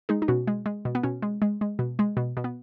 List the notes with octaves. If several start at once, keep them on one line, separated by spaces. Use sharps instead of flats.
G#3 D#4 G#4
D#4
B2 C#4 F#4
G#3
G#3
B2
B3
B2 C#4
G#3
G#3
G#3
B2
G#3
B2
B2
B3